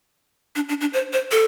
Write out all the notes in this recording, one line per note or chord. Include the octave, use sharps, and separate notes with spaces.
D4
D4
D4
C5
C5
A4